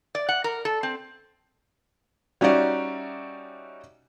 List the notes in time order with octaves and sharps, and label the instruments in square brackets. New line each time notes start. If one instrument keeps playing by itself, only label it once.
[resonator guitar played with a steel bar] D5
F#5
A#4
A4
C4
[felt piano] G3 C#4 D#4 F#4 D5 E5